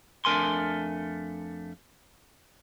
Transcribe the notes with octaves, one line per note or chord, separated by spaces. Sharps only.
F2 A3 D4 A#4 G#5 C6